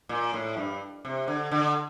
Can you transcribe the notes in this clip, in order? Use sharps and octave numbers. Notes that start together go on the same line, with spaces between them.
A#2
A2
G2
C3
D3
D3